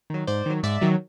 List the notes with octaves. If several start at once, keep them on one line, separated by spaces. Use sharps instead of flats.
D#3 F#3
G#2 C5 D5
D#3 F#3
G#2 D5 E5
D#3 F#3